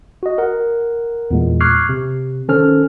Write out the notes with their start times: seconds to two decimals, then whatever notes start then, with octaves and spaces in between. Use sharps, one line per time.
0.23 F#4 D#5
0.38 A#4 F#5
1.31 E2 A#2 G#3
1.61 C#6 D6 F6 F#6 G#6 C7
1.89 C3
2.49 D#3 C#4 A4 C5 F6